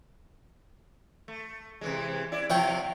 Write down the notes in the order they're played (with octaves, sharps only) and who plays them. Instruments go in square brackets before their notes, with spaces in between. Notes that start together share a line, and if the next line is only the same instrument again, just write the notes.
[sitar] A3
C3 E3 G#3
E4 D5
[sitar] C3 F3 F4 [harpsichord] E4 C#5 G5